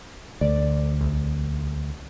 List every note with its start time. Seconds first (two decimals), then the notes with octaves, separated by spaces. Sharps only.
0.41 D2 D5
1.01 C2